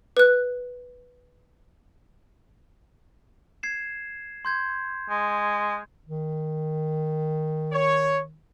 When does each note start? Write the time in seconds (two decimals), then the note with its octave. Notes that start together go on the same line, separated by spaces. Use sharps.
0.17 B4 F#6
3.63 G#6 C7 E7
4.45 C6 G6 G#6
5.09 G#3
6.06 D#3
7.72 C#5